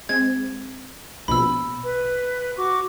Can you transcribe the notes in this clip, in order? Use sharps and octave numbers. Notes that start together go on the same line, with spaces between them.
G#3 C4 G#6
A#1 B2 B5 E6
B4
F#4 C#6 D6